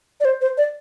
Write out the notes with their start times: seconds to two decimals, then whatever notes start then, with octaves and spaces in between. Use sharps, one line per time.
0.20 D5
0.25 C5
0.41 C5
0.58 D5